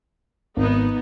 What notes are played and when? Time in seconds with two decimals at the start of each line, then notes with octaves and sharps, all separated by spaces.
0.56 G#1 B3 D#4